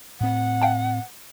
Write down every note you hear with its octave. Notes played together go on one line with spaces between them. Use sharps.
A2 C4 F#5
F5 G5 A5